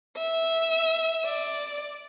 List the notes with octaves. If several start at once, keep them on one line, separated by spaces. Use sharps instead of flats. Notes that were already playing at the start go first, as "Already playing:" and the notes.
E5
D5